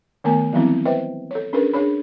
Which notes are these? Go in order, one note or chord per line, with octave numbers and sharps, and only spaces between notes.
D#3 A3 B3 A#4 G#5
E3 F#3 G3 B3 C4 E4
B4 C5 D#5 E5 G5
A4 C#5
C#4 D4 G#4 A#4 B4
D4 G#4 C#5 B5